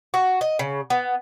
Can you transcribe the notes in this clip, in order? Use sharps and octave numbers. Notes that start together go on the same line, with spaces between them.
F#4
D#5
C#3
B3